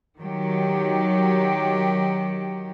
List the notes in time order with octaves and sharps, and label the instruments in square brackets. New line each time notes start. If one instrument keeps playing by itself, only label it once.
[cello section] D#3 F#3 G4